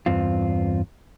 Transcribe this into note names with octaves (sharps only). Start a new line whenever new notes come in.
E2 G2 C4 F4